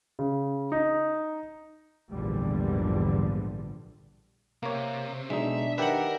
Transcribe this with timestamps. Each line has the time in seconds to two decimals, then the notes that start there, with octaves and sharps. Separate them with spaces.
0.19 C#3
0.72 D#4
2.11 A#1 E2 G#2 D3 F3 G3
4.63 C3 A#3 C#5
5.30 B1 G#3 D4 D#4 E5
5.78 D#3 G4 A#4 B4 E5 F#5